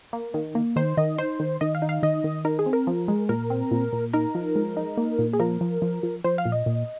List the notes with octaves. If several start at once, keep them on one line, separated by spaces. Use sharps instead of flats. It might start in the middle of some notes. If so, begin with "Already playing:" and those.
A#3
D#3
A#3
D#3 C5
D#3 D#5
D#4 C5
D#3
D#3 D#5
F5
D#4
F5
D#3 D#5
D#3
D#4 A#4
G#4
C4
A#4
F3
G#3
A#2 A#4
C4
A#2
A#2
D#4 A#4
F3
G#3
D#4
A#3
A#2
G#4
F3 A#4
F3
F3
F3
F3 C5
F5
A#2
D#5
A#2